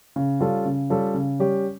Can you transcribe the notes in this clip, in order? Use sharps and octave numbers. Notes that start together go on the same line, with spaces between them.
C#3
G3 C#4 F4 A4
C#3
G3 C#4 F4 A4
C#3
G3 C#4 G4